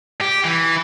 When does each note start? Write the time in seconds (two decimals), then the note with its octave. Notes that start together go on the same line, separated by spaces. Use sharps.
0.21 G4
0.44 E3